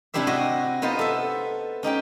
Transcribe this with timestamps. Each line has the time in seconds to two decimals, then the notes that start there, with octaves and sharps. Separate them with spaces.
0.14 C3 D4 E4 G4 C5 E5
0.27 F#4 D#5
0.82 B3 D#4 F4 B4 C5
0.99 A4 E5
1.83 C#4 D#4 G4 G5